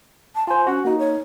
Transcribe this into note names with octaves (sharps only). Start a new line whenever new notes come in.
A5
F4 C5 G#5
C#4 F#4 F#5
A#3 D#4 F#4
C#5